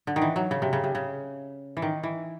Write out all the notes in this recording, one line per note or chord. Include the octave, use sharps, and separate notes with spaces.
D3
D#3
E3
F#3
C#3
C3
C#3
C3
C#3
E3
D#3
E3